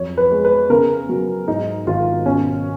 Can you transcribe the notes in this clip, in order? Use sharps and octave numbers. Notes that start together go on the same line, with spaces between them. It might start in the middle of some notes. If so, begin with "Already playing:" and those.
Already playing: F2 F#3 C#5
B4
G#3
B4
C#3 A#4
F#3
G#2 D#4
G#1 F4
B2 C#4